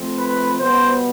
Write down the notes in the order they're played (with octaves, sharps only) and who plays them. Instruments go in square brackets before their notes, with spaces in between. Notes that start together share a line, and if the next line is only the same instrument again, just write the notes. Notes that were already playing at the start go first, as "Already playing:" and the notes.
Already playing: [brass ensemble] F3 A3 C4
[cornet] B4
[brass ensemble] B2 G3 B3 [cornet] C5